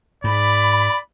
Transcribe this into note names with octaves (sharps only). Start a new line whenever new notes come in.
G#2 D5 B5